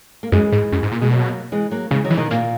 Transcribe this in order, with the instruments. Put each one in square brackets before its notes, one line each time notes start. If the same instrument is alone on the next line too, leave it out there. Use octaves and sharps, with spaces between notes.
[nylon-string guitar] A#3
[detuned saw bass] F#2 [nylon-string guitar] E3 G#3
[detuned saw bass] G#2
F#2
G#2
A#2
[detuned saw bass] B2 [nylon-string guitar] G#3
[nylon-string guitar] F#3 A#3
E3 G#3
F#3 A#3
[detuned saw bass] C#3 [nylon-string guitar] E3 G#3
[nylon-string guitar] D#3 F#3
[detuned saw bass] E3
[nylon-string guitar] B2 D#3
[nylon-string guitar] A#2 [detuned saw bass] A#3